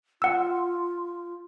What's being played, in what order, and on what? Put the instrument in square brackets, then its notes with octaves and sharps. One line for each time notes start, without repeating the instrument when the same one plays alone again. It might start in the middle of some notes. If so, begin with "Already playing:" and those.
[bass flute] F4 [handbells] F#5 E6